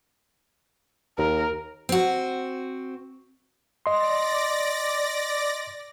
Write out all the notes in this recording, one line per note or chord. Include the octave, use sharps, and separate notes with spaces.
D#2 A#4
C4 F#4
D5 D#5 C6 A#6